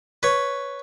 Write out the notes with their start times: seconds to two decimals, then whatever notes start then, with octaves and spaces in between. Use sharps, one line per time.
0.23 B4 C#5